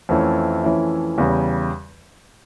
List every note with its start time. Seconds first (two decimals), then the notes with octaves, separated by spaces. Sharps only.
0.09 F2 E3 A3 C#4 E4
0.64 F2 E3 A3 C#4 E4
1.18 E2 C#3 G3